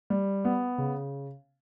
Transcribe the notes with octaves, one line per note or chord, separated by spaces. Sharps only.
G3
B3
C#3